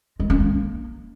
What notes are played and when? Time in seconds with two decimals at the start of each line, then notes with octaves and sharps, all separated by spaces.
0.20 G#3
0.30 C#4
0.40 A#3